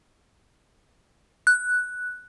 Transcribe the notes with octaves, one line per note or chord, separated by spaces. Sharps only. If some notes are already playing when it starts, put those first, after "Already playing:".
F#6